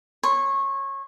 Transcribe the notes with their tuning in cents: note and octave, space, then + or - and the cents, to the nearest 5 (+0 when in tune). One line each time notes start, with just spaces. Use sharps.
C#5 -20 C6 -25